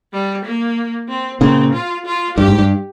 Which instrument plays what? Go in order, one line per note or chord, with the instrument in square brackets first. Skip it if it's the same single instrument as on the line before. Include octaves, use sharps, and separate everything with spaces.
[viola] G3
A#3
C4
[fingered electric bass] A#2 C#3 [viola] C4
[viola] F4
F4
[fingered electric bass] G2 [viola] G4
[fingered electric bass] G#2
G2